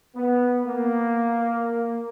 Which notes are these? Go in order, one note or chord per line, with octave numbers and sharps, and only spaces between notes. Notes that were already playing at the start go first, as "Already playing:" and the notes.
B3
A#3